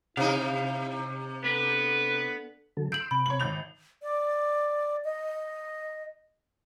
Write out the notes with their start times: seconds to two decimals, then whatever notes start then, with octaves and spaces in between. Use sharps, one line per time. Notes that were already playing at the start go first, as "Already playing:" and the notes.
0.17 C3 D#4 E4 F5
1.44 B3 D4 A4 B4
2.77 D3 F#3 A4
2.92 C6 E6 G6 D7 F#7
3.11 C3 B5
3.26 C#5 F#7
3.39 G#1 G6 F7
4.02 D5
5.04 D#5